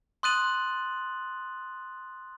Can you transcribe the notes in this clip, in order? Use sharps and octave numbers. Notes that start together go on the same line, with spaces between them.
C6 D#6 F#6 A6 D#7 F#7